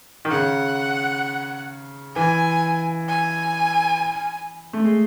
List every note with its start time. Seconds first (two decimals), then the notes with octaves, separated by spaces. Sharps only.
0.25 D#3
0.31 C#3 F#5
2.16 E3 G#5
3.09 G#5
4.73 A3
4.84 G#3